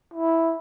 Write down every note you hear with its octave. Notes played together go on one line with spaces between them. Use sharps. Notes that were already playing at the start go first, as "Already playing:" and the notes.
E4